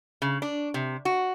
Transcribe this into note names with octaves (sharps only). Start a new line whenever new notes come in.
C#3
D4
C3
F#4